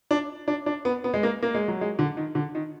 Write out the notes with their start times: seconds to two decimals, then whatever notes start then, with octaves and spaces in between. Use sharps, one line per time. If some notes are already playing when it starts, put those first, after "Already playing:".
0.11 D4
0.48 D4
0.66 D4
0.85 B3
1.04 B3
1.14 G#3
1.23 A#3
1.43 A#3
1.54 G#3
1.68 F#3
1.81 G#3
1.99 D3
2.17 D#3
2.35 D3
2.55 D#3